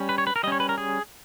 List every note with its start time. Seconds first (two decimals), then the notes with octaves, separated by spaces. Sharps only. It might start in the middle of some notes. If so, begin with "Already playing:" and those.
Already playing: G3 C#4
0.09 B4
0.18 C#5
0.27 B4
0.36 A#4
0.43 G3 D#5
0.47 C#4 C#5
0.60 B4
0.69 A#4
0.78 G#4